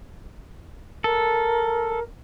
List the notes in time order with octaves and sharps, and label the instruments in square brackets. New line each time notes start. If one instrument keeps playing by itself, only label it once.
[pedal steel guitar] A4 [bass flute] A#4